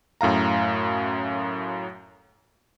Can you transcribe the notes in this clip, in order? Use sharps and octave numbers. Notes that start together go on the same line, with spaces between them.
F#2 A2 F5 A#5